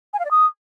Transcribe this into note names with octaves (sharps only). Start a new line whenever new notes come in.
G#5
F5
D5
D#6